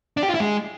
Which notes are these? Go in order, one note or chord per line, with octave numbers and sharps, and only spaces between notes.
D4
G4
F4
E4
G#3